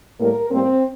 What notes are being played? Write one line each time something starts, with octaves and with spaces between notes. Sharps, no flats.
A2 G3 A#3 A#4
A2 G3 A#3 C4